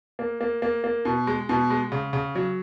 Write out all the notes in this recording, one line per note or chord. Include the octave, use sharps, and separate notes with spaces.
A#3
A#3
A#3
A#3
B2
G#3
B2
G#3
C#3
C#3
F#3